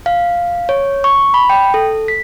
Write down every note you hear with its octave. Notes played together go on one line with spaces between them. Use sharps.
F5
C#5
C#6
B5
G5
A4
B6